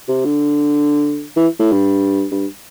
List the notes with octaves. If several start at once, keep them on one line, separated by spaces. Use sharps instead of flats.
C3
D3
E3
A2
G2
G2